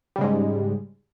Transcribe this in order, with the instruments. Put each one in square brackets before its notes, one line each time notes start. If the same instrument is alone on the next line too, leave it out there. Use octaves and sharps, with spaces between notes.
[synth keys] G3
C#3
G#3
G#2